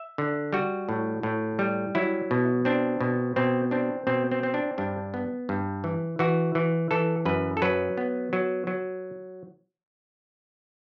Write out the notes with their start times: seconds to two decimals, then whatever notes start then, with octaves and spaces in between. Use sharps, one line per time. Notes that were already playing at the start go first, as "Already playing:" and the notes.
Already playing: E5
0.18 D3
0.53 G3 F#4
0.89 A2
1.23 A2
1.59 G3
1.95 F#3 E4
2.31 B2
2.65 C4 D4
3.00 B2
3.36 B2 C4
3.71 C4 D4
4.07 B2 C4
4.31 C4
4.43 C4
4.54 D4
4.78 G2 D4
5.14 B3
5.49 G2
5.84 E3
6.19 E3 F#4
6.55 E3
6.91 E3 A4
7.25 F#2 B4
7.57 A4
7.62 F#3 B4
7.98 B3
8.33 F#3
8.67 F#3